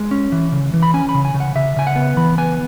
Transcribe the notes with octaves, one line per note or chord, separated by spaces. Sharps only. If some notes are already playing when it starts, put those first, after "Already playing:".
Already playing: G#3
C#4
E3
C#3
E3
B5
C#4 G#5
B5
C#3
G#5
C#3
F#5
C#3 E5
C#3 G#5
F#5
B3
E3 B5
B3 G#5